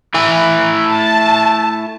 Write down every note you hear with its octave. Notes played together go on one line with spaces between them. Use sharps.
A3 E4 G#5
A5